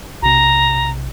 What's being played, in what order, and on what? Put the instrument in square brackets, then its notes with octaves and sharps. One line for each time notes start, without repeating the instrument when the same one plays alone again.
[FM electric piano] B1 C3 [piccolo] A#5